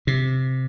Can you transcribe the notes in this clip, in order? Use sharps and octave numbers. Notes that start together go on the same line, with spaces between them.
C3